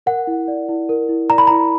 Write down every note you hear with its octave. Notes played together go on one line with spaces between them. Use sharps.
A#4 F#5
E4
D5
E4
A#4
E4
D5 A#5
B5
E4 A#5